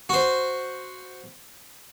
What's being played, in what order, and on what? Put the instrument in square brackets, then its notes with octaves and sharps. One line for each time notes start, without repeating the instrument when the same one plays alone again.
[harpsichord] F#4 C5